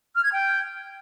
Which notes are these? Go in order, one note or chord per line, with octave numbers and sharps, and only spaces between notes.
F6
G#6
G5